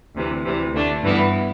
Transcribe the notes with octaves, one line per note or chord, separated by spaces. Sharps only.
D2 C3 E3
D2 C3 E3
D2 D3 A3 D4
G2 E3 B3 E4